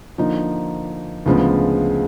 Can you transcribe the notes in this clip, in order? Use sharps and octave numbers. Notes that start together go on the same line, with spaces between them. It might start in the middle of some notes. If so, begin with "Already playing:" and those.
D3 F3 A#3 D#4
D2 C#3 F3 G#3 B3